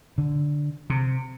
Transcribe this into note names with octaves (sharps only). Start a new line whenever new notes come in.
D3
C3